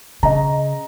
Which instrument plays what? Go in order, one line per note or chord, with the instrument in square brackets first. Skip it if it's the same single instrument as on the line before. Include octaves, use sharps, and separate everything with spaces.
[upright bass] C#3 [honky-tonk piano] D#5 A#5